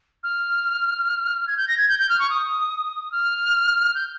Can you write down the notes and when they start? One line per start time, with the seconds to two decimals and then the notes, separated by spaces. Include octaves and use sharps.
0.23 F6
1.47 G#6
1.57 G6
1.67 A#6
1.77 G#6
1.88 G6
1.99 G6
2.09 F6
2.19 C#6
2.29 D#6
3.11 F6
3.94 G6